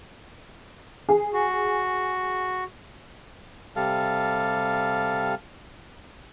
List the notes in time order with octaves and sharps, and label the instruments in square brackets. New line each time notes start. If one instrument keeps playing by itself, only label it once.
[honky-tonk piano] G#4
[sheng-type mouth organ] F#4
[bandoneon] C3 G3 A4 F5